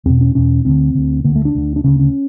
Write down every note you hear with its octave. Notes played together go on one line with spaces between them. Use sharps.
E2 B2 C4
C#4
E2 B2 C#4
D2 D3 C4
D2 D3
D3 A#3
D2
A3
D4
D2 D3
D4
D2 C#3 C#4
C#4